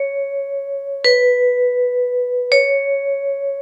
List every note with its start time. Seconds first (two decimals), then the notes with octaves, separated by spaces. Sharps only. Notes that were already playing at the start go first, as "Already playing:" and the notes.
Already playing: C#5
1.04 B4
2.52 C#5